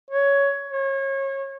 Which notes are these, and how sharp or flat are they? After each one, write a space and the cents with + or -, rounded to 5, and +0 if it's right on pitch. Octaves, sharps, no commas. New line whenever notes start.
C#5 +10
C#5 -30